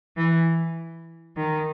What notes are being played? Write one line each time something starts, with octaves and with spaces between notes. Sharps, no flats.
E3
D#3